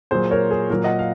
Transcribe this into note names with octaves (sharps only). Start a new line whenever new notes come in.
A#2 F#3 G#4 C5
A#4 C#5
G#4
A#2 F#3 A#4
D#5 F#5
F5